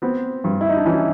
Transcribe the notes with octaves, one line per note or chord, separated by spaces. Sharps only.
B3 C4
G2
E4
D#4
D4
E3 C#4